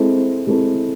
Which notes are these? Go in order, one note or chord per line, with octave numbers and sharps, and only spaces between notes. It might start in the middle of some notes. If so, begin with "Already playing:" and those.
Already playing: G#3 C4 E4 A4
G#3 C4 E4 A4